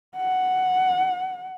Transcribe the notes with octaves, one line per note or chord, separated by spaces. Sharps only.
F#5